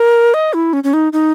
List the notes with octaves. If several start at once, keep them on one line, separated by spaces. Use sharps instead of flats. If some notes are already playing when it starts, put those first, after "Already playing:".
Already playing: A#4
D#5
E4
C#4
C#4
D#4
D#4